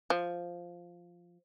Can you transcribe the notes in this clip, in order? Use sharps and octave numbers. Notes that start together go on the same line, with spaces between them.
F3